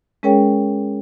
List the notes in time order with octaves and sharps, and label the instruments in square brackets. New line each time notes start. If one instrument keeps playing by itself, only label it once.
[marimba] G#3 C#4 G#4 A#4 C#5 G5